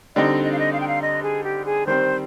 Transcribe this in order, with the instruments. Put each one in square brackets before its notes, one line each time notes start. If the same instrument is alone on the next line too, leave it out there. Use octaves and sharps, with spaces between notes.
[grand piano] D3 G3 C4 D#4 [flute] D#5
[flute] D#5
F5
D#5
F5
G5
F5
D#5
G#4
G4
G#4
[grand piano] D#3 G3 C4 [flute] C5